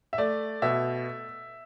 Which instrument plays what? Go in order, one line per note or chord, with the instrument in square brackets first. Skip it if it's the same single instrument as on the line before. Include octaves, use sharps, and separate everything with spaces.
[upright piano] E5
A3 D5
B2 E5